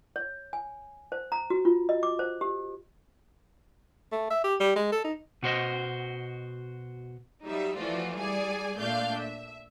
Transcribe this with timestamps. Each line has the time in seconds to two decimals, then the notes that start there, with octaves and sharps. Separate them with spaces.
0.16 C#5
0.53 G#5
1.12 C5
1.32 A#5
1.50 F#4
1.65 F4
1.89 D#5
2.03 D6
2.19 C5
2.41 G4
4.12 A3
4.30 E5
4.44 G4
4.60 G3
4.76 G#3
4.92 A4
5.04 D#4
5.42 B2 F#4 C5 D#5
7.44 F#3 G3 D#4 E5
7.76 E3 F3 A3 F4 F#4 D5
8.17 G3 G#4 D5 G#5
8.78 A#2 A3 D4 D5 F5 G6
9.19 E5